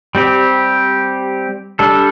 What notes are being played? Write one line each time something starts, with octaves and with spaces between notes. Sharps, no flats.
G3 C4 G4
G3 D4 A4